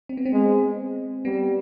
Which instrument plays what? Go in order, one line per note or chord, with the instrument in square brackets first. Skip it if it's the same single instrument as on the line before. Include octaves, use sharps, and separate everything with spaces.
[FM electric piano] C4
B3
C4
[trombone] G#3
[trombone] G3 [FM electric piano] B3